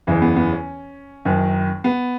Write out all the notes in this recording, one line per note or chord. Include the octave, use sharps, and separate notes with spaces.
F#1 E2 C#3 E3
B3
B3
C#4
F#1 F#2 D#3
B3